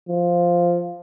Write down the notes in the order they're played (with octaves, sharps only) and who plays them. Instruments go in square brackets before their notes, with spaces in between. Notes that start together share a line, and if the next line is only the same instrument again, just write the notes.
[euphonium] F3